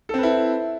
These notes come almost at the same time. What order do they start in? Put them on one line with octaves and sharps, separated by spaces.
A4 C4 B4 E4